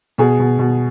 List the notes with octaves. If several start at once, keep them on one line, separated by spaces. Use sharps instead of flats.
B2 G#4
B2
B2